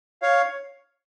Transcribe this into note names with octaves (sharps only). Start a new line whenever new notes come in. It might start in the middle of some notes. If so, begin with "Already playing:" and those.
C#5 F5